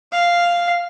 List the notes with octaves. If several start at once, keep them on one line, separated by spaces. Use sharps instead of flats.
F5